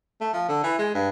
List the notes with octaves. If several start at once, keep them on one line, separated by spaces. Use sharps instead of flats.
A3
F3
D3
E3
G#3
G2